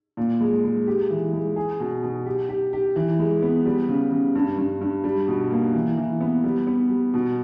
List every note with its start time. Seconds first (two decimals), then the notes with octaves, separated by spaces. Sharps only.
0.17 A#2
0.41 G#3
0.64 G#3
0.87 G4
1.10 E3
1.33 G#3
1.56 G#4
1.80 B2
2.03 B2
2.26 G4
2.49 G4
2.73 G4
2.96 E3
3.19 G#3
3.42 B3
3.65 G3
3.88 C#3
4.11 C#3
4.35 G2
4.58 G2
4.81 G2
5.04 G3
5.28 B2
5.51 A#3
5.74 E3
5.97 E3
6.20 B3
6.44 G3
6.67 B3
6.90 G3
7.14 B2